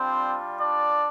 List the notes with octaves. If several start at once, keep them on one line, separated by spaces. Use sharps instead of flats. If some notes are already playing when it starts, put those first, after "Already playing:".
Already playing: G3 C4 D4 F4 C5
D4 D5